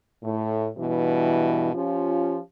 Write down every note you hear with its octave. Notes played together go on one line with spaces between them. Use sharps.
A2
G2 B2 E3
F3 C#4 F4 G4